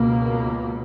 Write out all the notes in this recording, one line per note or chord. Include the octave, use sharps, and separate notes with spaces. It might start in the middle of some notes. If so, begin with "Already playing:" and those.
Already playing: C#2 B2 A#3